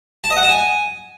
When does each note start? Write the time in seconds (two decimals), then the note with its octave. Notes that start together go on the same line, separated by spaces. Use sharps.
0.24 A5
0.30 D#5
0.37 F#5
0.43 A5
0.49 G#5